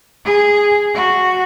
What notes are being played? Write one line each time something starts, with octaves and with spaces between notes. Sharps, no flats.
G#4
F#4